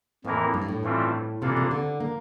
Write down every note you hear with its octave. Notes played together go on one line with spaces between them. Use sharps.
F2 A2 E3 A#3 E4 A#4
G2
A2
G2 E3 A3 C4 F4
C3 E3 A#3 D4 F4 A4
C3
D3
A#3